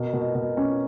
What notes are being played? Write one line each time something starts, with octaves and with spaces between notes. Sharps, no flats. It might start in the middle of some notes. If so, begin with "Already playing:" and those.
Already playing: B2 A#4
B2
B2
C#4